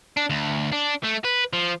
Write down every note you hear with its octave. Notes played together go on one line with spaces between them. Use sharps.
D4
D2
D4
A3
B4
F3